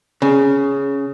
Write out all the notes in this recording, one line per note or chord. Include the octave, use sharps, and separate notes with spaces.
C#3